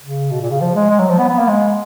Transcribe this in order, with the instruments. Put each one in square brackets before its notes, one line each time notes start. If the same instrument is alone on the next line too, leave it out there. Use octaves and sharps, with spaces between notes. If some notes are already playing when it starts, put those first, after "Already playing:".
[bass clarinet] C#3
B2
A#2
C#3
F3
G#3
G#3
F#3
F3
B3
B3
A#3
G#3